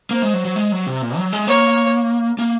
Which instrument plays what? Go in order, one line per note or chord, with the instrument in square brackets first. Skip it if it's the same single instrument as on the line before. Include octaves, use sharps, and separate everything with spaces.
[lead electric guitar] A#3 [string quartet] C5
[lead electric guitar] G#3
F#3
F#3
G#3
F#3
C3
A#2
F#3
G#3
[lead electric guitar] A#3 [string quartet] C#5
[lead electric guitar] A#3